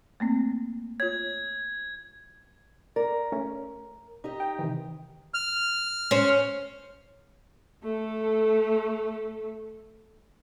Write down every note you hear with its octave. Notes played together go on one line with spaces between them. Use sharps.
A3 A#3 C4
F4 C#5 G#6
A#4 D5
A3 C#4
D#4 G4 D#5
G5
C3 D#3 E3
F6
C#4 C5
A3 A4